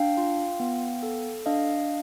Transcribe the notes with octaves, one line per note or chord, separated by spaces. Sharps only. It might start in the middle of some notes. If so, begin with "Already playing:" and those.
Already playing: D4 F5 G5
F4
B3
A4
D4 D#5 F5